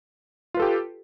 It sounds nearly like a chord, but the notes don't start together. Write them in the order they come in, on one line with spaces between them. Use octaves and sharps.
F4 B4 A4 G4